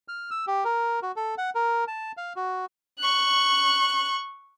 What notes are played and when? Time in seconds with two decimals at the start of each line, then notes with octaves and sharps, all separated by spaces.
0.08 F6
0.31 E6
0.47 G4
0.64 A#4
1.02 F#4
1.16 A4
1.38 F#5
1.55 A#4
1.88 A5
2.17 F5
2.36 F#4
3.00 C#6 F#6